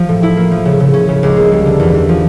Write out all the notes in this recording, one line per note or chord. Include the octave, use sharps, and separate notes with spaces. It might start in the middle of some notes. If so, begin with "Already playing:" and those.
Already playing: F3
A2
E4
A#3
F3
C#3
C#3
C#4
C#3
C#2
A#3
G3
D3
E2
E2
F3